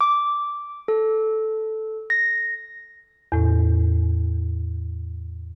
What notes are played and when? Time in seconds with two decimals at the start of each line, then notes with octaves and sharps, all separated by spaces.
0.01 D6
0.88 A4
2.10 A#6
3.32 E2 A2